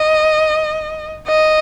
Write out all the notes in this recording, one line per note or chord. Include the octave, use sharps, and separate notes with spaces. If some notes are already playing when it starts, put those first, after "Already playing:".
Already playing: D#5
D#5